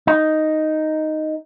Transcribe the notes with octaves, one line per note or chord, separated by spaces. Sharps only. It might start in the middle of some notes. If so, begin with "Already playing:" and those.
D#4